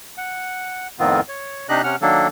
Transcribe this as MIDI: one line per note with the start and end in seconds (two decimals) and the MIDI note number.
0.17 0.87 78
0.99 1.21 41
0.99 1.21 45
0.99 1.21 51
0.99 1.21 59
0.99 1.21 60
0.99 1.21 65
1.28 1.67 73
1.69 1.82 48
1.69 1.82 62
1.69 1.82 63
1.69 1.82 67
1.69 1.82 75
1.69 1.82 90
1.84 1.96 48
1.84 1.96 61
1.84 1.96 78
1.84 1.96 89
2.02 2.28 51
2.02 2.28 54
2.02 2.28 58
2.02 2.28 62
2.02 2.28 69